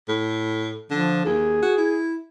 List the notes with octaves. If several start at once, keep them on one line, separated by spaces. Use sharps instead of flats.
A2
D3 F3
D#2 G#4
F#4
E4